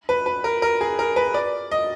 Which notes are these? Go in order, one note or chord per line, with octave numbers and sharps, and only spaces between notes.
B4
B4
A#4
A#4
G#4
A#4
B4
D5
D#5